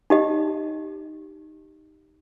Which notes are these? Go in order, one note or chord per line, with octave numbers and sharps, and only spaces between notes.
D#4 G4 D#5